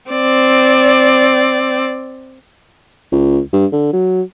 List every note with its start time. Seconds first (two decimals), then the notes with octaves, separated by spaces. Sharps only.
0.11 C4 D5
3.12 C#2
3.53 G2
3.72 D3
3.93 F#3